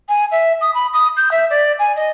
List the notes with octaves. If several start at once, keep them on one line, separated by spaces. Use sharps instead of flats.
G#5
E5
D#6
B5
D#6
G6
E5
D5
G#5
D#5